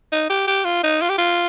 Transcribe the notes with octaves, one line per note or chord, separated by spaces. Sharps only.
D#4
G4
G4
F4
D#4
F4
G4
F4